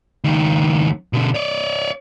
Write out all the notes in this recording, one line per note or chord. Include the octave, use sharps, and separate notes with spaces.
C#2 D#3
B2 D3
C#5 D5